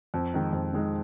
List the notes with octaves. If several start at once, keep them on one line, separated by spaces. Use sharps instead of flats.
F2
D#3 G#3 D#4
F2
D#3 G#3 D#4